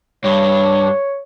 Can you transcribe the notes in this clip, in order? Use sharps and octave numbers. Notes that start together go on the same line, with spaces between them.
G2 C#5